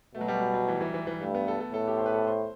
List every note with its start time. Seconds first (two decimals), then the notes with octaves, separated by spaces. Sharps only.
0.15 B2 A3
0.21 F#3
0.28 G3
0.40 F#3
0.54 F#3
0.68 E3
0.81 E3
0.94 E3
1.07 E3
1.21 G2 A3
1.35 B3
1.48 A4
1.60 A4
1.74 A2 A4
1.88 G4
1.98 C5
2.06 B4
2.14 A4
2.27 C5